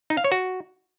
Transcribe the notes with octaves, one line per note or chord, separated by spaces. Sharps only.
D#4
F5
C#5
F#4